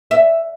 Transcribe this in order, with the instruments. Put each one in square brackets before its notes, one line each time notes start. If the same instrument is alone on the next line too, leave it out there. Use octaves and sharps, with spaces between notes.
[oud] E5